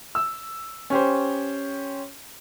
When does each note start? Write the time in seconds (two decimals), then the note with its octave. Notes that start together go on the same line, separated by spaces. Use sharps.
0.15 E6
0.90 C#4 G4 C5